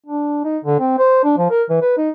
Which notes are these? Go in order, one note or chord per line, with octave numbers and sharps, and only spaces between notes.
D4
D#4
D3
C4
C5
D4
F3
A#4
E3
B4
D#4